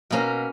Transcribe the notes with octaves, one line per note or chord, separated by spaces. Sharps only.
B2 A#3 C#4 A#5